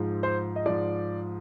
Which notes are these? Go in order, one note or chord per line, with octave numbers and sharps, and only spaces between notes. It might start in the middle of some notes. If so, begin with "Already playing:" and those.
Already playing: G#2 F3
C5
D#5
G#2 F3 D5